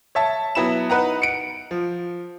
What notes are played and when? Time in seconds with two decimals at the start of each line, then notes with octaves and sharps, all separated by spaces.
0.15 C#5 E5 A5
0.55 F#3 B3 E4 B5 E7
0.90 D#4 B4 F#5 A#5
1.22 C#7 D7
1.71 F3